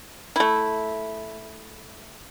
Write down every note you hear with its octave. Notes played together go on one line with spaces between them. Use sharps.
A3 E4